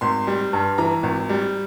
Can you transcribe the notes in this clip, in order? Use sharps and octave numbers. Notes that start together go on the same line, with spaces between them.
G#1 C6
G3
G2
E3 A#5
G#1
G3